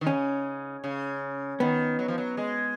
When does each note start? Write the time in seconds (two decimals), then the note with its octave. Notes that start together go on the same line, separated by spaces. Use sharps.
0.01 D#3
0.06 C#3 C#4
0.84 C#3
1.60 D#3 B3
1.99 F#3
2.08 F3
2.18 F#3
2.37 G#3